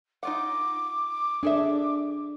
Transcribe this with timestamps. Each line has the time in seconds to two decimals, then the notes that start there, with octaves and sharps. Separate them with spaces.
0.23 D#4 F4 F#5 D6
1.43 D4 G#4 A4 E5